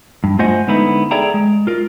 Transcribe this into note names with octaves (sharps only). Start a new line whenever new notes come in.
G2
A3 F4 C5 D#5 F#5 G#5
D3 G#3 B3 D#4 E4 B4
G#4 A4 D5 E5 G5 A#5
G#3
F4 A#4